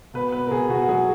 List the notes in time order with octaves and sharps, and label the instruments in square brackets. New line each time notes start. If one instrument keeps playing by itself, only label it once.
[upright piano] B2 B4
B3 B4
A#4
B2 G#4
B2 F#4
F#4
F#3 G#4